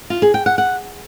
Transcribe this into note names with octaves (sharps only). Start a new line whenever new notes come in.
F4
G#4
G5
F#5
F#5